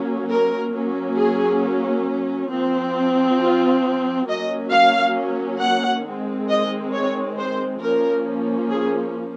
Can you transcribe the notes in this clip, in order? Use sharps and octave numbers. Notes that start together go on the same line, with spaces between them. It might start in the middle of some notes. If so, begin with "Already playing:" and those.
Already playing: F#3 A#3 C#4
A#4
F#3 A#3 C#4
G#4
F3 C4
F4
F#3 A#3 C#4 D#5
F5
F#5
D#3 G#3 C4
D#5
C#5
C5
F3 A#3 C#4 A#4
G#4